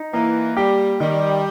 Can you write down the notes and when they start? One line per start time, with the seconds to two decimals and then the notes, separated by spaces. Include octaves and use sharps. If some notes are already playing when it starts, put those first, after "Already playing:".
Already playing: D#4
0.13 E3 A#3
0.57 G3 G4
1.00 D#3 G3